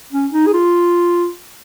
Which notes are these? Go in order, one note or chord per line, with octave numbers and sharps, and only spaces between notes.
C#4
D#4
G#4
F4